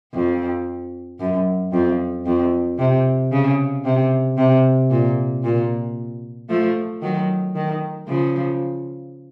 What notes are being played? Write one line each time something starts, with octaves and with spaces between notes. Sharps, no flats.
F2
F#2
F2
F2
C3
C#3
C3
C3
A#2
A#2
F3 A3
D#3 F#3
D#3
C#3 F3